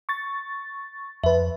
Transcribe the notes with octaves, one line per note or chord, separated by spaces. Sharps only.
C#6 A6
F2 B4 E5